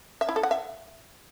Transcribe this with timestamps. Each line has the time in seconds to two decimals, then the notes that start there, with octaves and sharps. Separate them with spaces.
0.21 E5
0.29 E4
0.36 A4
0.43 F#5
0.51 E5